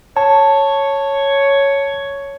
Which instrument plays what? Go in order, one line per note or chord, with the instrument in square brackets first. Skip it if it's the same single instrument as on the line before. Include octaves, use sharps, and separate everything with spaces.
[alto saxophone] C#5 [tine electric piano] A5